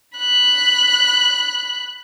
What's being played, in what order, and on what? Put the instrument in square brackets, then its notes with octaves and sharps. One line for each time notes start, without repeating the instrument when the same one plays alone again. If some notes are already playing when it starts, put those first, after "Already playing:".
[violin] B5 F#6